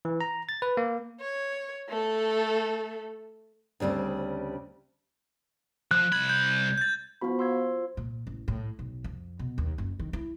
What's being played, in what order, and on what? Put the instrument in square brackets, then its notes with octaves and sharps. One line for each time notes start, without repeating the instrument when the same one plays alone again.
[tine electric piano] E3
A#5
A6
B4
A#3
[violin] C#5
A3 A4
[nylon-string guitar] D2 C#3 G3 C4
[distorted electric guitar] F3 [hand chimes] F#6
[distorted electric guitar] C2 B5 [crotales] G#6
[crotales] G6
G6 A6
[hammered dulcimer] F3 F4 [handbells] B3 F#4 B5
[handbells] C6 E6 G#6
[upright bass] A#2
A1
A2
B1
F2
B2
D#2
F#1
D#3
E4